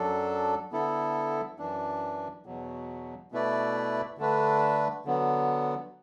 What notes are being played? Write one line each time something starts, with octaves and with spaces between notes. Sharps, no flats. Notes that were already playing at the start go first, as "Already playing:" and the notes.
Already playing: F#2 F#3 D4 A4
D3 B3 E4 A4
F#2 E3 D4
E2 B2 F#3
B2 A3 E4 B4 D5
D3 A3 D4 B4
D3 F#3 B3